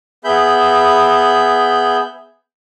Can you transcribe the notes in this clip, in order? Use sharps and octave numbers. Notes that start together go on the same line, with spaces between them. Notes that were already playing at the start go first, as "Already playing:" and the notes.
B3 G#4 E5 B5 G6